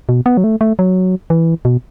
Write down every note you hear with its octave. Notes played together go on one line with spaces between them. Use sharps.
B2
B3
F#3
A3
A3
F#3
E3
B2